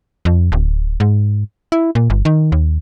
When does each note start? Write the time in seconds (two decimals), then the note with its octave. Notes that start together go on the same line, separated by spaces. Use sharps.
0.25 F2
0.52 D1
1.00 G#2
1.72 E4
1.95 A#2
2.10 G1
2.25 D#3
2.52 D#2